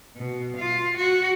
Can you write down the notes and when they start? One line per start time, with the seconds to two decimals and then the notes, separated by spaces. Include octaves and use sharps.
0.16 B2
0.57 F4
0.97 F#4